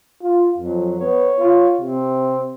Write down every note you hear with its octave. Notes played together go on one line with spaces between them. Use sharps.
F4
F2 F#3
B3 C#5
F4
C3 C4